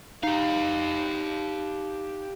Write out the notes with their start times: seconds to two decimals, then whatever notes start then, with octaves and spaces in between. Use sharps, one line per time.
0.23 D#4 G4 F5